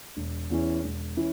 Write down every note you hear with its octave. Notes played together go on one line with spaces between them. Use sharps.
E1
E2 E3 C#4 E4
E1
E3 C#4 E4